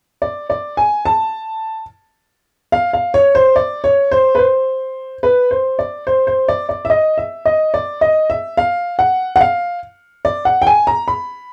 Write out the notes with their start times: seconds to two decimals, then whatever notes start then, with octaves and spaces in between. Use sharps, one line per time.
0.22 D5
0.50 D5
0.77 G#5
1.06 A5
2.72 F5
2.93 F5
3.14 C#5
3.35 C5
3.56 D5
3.84 C#5
4.12 C5
4.35 B4
4.39 C5
5.23 B4
5.51 C5
5.79 D5
6.07 C5
6.27 C5
6.48 D5
6.69 D5
6.85 E5
6.90 D#5
7.18 E5
7.46 D#5
7.74 D5
8.01 D#5
8.30 E5
8.57 F5
8.99 F#5
9.36 F#5
9.41 F5
10.25 D5
10.45 F#5
10.62 G5
10.67 G#5
10.87 A#5
11.08 B5